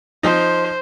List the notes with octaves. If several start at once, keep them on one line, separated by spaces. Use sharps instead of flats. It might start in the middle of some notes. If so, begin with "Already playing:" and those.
F3 D#4 C5